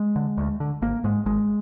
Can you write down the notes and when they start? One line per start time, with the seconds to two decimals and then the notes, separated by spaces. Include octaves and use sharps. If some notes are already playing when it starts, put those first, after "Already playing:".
Already playing: G#3
0.16 D3
0.38 D2
0.60 D3
0.82 G#1 A#3
1.04 G#2 G#3
1.26 G#1 G#3